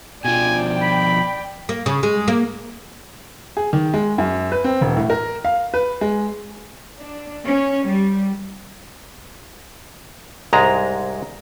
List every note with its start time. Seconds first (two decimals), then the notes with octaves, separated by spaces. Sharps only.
0.25 B2 F3 D5 G5 G#5
0.82 B5
1.69 A#3
1.86 C#3
2.03 G#3
2.28 A#3
3.57 G#4
3.73 D#3
3.94 G#3
4.18 F#2
4.52 B4
4.64 C4
4.81 E1
4.97 A2
5.10 A#4
5.45 F5
5.74 B4
6.01 G#3
7.00 D4
7.45 C#4
7.87 G3
10.53 C2 G#2 G#3 A#5